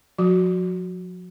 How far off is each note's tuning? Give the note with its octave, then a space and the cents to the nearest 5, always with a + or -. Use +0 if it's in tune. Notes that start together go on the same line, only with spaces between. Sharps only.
F3 +45 F#4 +0